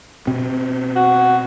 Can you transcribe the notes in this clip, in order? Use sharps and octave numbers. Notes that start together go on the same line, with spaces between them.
B2 C4
F#4